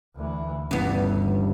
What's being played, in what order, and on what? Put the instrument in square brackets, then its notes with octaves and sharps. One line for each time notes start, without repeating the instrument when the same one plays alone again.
[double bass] D2 E3
[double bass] G1 D2 [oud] G2 B3 [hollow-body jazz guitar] C#3 E3